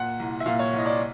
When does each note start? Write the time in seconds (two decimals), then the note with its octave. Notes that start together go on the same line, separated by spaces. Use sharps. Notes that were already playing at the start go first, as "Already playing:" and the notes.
Already playing: A#2 F#5
0.20 C2
0.40 E5
0.46 A#2 F5
0.59 C#5
0.73 C2
0.78 D#5
0.86 D5